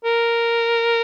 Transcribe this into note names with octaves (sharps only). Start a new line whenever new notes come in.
A#4